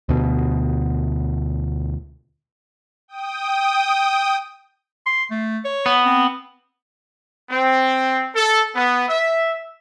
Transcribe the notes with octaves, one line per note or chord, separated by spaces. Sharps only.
D2 B2
G5 D#6
C6
A3
C#5
B3
C4
C4
A4
B3
E5